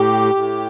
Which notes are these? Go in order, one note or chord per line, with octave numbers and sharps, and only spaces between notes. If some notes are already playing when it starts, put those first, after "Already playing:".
Already playing: A2 G4
A2